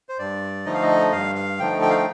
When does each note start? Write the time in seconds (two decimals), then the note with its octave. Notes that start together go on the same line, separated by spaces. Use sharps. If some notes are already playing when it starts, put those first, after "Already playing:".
0.09 C5
0.19 G2 D5
0.65 D3 F3 A3 D#4 D#5
0.74 F5
0.82 D#5
1.12 G2 F5
1.35 F5
1.59 D3 F3 A3 D#4 G5
1.82 G5
1.90 F5
1.97 G5